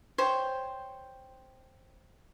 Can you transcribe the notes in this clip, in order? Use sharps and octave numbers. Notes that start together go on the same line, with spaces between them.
C5 C#5 G5